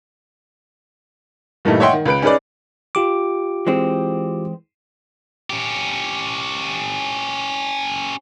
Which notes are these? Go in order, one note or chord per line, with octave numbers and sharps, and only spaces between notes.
G2 A#2 E3 G3 A3 D#4
C#5 D#5 E5 F#5 G5 C6
D#3
C#2 B4 D7
C#4 D#4 G#4 B4 D5
F4 G4 D6
E3 G#3 C4
C#4 G4